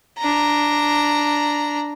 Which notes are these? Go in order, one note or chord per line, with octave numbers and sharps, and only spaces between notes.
D4 A#5